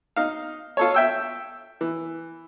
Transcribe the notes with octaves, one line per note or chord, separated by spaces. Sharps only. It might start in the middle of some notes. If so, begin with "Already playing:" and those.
D#4 F5
F4 A4 C#5
E5 G5 E6
E3